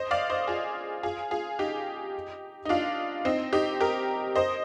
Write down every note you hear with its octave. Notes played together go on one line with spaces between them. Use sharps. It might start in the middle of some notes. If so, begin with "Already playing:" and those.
Already playing: C5 D#5
D5 F5
C5 D#5
F4 G#4
F4 G#4
F4 G#4
D#4 G4
D#4
D4 F4
C4 D#4
D#4 G4
G4 A#4
C5 D#5